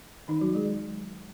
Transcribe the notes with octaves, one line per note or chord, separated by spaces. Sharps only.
D#3 D#4
F#3 F#4
G#3 G#4